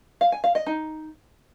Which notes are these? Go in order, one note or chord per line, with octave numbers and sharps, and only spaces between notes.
F5
G#5
F5
D#5
D#4